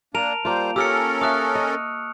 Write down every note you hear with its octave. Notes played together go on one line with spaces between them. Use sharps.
A#3 D4 A#4 A5 D7 F7
G3 A#3 F4 C5
C#4 G4 A4 A#4 E6 F6 C#7
E5 F5 C#6 D#6 F#6
D#5